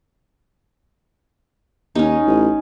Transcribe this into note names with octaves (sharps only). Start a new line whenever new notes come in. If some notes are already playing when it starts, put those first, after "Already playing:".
D#2 C#4 D#4
A1